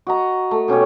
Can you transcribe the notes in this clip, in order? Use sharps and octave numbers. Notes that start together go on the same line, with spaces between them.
F#4 D#5 A#5
A3
B2 C#4 G4 C#5